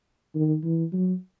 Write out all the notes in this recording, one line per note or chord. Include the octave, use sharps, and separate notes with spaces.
D#3
E3
F#3